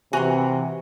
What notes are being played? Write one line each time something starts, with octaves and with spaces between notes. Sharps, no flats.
C3 E3 F#4 G#5 A#5 C6